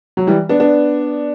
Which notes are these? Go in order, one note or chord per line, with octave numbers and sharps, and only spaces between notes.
F#3
E3 G3
B3 D4
B3 D4